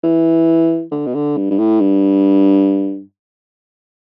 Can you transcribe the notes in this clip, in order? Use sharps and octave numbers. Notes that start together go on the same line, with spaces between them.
E3
D3
B2
D3
G2
G2
A2
G2